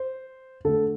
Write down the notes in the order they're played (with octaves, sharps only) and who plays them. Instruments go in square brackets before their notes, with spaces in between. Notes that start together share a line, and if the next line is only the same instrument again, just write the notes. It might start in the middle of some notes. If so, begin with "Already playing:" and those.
Already playing: [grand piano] C5
D3 A3 A4